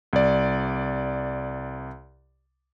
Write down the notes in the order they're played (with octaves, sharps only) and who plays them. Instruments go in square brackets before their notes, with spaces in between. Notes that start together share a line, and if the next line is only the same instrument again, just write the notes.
[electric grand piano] C2 D5